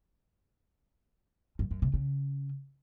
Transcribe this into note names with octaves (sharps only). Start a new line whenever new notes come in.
F#2
F#2
C3
C#3